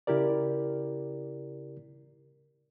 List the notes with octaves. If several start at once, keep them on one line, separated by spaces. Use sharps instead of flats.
C#3 E4 G4 A#4 D5